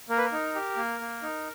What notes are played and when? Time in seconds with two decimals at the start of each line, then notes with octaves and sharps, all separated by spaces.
0.09 A#3 A#4
0.18 B4
0.25 A#4
0.32 D#4
0.55 G4
0.77 A#3
1.00 A#3
1.23 D#4